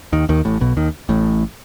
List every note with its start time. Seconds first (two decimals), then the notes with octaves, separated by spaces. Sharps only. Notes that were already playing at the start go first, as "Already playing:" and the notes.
0.12 D#2 D#3
0.29 D#2 D#3
0.45 A1 A2
0.61 B1 B2
0.77 D#2 D#3
1.09 A1 A2